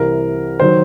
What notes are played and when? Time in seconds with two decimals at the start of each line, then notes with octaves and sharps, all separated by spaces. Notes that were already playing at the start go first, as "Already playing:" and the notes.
Already playing: C2 C3 E3 A#4
0.60 D#3 F#3 C5